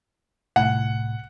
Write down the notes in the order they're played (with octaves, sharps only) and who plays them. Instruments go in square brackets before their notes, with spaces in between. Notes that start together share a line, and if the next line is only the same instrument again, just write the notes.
[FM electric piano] C2 A2 [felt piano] F#5